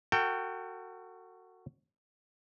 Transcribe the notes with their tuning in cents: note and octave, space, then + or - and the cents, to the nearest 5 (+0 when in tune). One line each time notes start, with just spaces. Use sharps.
F#4 +0 A4 +45 G5 -5